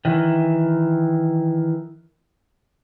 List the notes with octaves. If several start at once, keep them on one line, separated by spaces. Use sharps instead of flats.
D#3 E3